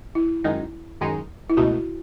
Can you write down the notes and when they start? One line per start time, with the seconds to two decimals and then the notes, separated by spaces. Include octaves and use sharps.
0.15 E4
0.44 F#2 D#3 G#3 D#4
1.01 F#2 D#3 G#3 D#4
1.50 E4
1.57 C#2 B2 A3 D#4 F#4